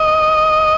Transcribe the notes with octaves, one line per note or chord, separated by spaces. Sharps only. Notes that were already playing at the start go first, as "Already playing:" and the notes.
Already playing: D#5